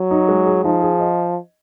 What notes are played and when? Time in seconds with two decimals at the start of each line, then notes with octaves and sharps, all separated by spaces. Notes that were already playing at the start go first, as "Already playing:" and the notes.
Already playing: F#3
0.11 D#4
0.29 G#3
0.46 G#4
0.64 F3 D#4
0.82 G#4
1.00 D#5